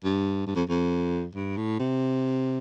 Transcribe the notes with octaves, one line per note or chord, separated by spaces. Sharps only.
G2
G2
F2
F2
G2
A2
C3